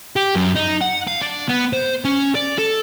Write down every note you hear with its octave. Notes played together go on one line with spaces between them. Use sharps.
G4
F#2
D#4
F#5
F5
D4
B3
C5
C#4
D5
A4